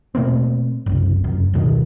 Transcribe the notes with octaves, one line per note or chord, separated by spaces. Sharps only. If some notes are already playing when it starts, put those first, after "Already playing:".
B2 A3 A#3 C4
F#1 C2
F1 F#2
D1 B2 D#3